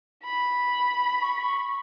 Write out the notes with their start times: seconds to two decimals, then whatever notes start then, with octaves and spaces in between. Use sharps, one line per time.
0.23 B5
1.22 C#6